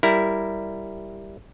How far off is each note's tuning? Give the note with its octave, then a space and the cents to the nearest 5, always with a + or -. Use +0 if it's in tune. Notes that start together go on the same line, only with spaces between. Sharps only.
G3 +0 E4 +0 A#4 +0